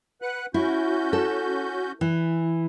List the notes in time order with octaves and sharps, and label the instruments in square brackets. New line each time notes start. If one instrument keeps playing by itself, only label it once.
[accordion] B4 F#5 F#6
[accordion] C#4 F#4 G6 [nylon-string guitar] E4
[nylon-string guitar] A4
E3